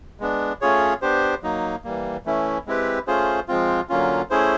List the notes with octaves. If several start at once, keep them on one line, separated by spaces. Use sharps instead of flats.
G#3 B3 D4
A3 C#4 F4 G#4 C#5
B3 D4 G4 C5
F#3 A#3 D#4
E3 G3 A#3
E3 A3 C#4 E4
G#3 C4 E4 G4 B4
A3 C#4 F4 G#4 C5
F3 G#3 C4 F4
D3 F#3 A#3 C#4 F4
A3 C#4 E4 G#4 C5